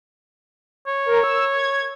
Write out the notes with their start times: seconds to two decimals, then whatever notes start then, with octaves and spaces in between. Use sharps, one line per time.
0.87 C#5
1.06 A#4
1.24 E6
1.53 G#6